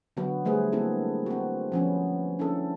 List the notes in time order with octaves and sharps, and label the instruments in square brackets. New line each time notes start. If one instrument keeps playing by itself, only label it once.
[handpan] D3 F#3 B3 F#4
G3 A3 G#4 B4 C5
G#3 A#3 C4 D4 E4 A4
C4 F#4
F3 B3 C#4
C#4 D4 E4 A4